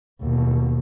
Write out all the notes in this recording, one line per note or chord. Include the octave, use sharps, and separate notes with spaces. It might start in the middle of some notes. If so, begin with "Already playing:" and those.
D#2 B2